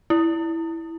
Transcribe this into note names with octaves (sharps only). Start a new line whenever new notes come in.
E4